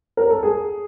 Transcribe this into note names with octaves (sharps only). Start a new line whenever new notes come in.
A#4
A4
G#4